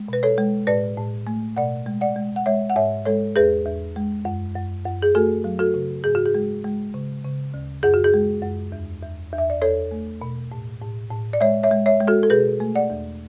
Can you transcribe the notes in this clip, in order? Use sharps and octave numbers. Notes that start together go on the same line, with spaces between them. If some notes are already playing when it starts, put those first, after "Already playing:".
Already playing: G#3
B2 B4
A4 C#5
G#3
A2 B4 D5
A2
A3
B2 D5 F#5
G#3
D5 F#5
G#3
F#5
G#3 C#5 E5
F#5
G#2 C#5 E5
G#3 A4 C#5
E2 G#4 B4
E2
G#3
F#2
F#2
F#2
G#4
A3 F#4 A4
F#3
F#4 A4
C#3
G#2 G#4
F#4
G#4
G#3
G#3
C#3
C#3
D2
F#2 G#4
F#4
G#4
G#3
F#2
E2
E2
E2
E5
D5
E2 A4 C#5
A3
B2
A2
A2
A2
D5
G#3 C#5 E5
C#5 E5
G#3
C#5 E5
G#3
F#4 A4
A4
B2 G#4 B4
A3
D5 F#5
E2